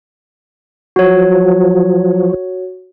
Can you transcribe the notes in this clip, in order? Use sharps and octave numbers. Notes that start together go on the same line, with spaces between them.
F3 F#3 F#4 C#5